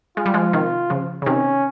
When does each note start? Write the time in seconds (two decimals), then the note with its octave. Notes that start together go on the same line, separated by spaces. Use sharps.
0.17 G#3 F4
0.26 G3
0.34 F3 G#3
0.53 C3 D#3 F4
0.90 C#3 F3
1.22 C#3
1.26 C3 D#3 C#4